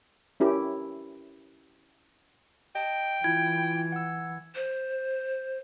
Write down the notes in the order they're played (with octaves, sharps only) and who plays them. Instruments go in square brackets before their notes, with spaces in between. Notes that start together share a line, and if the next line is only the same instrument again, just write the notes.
[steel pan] C#4 E4 G4 A#4
[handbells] D#5 A5 [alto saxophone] G5
[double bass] E3 [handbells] E4 F4 [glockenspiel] G#6
[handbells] F#5 E6
[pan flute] C5